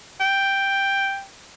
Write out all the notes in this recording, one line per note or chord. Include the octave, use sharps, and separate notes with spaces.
G5